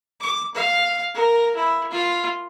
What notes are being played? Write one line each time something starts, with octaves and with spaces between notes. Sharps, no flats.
D6
F5
A#4
E4
F4